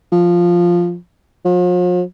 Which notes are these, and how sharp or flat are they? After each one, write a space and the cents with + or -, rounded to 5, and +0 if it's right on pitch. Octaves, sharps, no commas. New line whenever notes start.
F3 +0
F3 +45